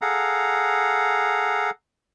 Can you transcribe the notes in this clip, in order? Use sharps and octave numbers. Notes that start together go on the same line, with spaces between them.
G#4 A4 F5 F#5 A#5